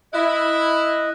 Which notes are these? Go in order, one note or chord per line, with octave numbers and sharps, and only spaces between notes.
E4 D#5 F#6